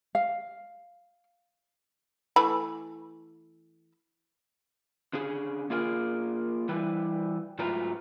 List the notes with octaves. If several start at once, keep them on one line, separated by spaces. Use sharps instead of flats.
F5
E3 A3 B5
D3 C#4 G#4
A#3 F4 G#4 A#4
E3 G3 E4 B4
G#2 F#3 A3 F4 B4 A#5